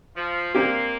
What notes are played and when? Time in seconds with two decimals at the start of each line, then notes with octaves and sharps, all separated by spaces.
0.16 F3
0.55 A#3 C4 D4 G4